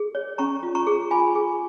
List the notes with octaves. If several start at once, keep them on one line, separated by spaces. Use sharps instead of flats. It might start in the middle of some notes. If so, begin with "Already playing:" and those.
Already playing: G#4
C#5
C#4 A#5 C#6
F4
A#5 C#6
G#4
F4 G#5 B5
G#4